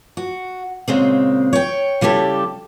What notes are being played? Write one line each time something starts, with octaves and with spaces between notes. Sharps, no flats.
F#4
A#2 C#3 G#3 C4
C#5 G5
C#3 G3 E4 G4 A4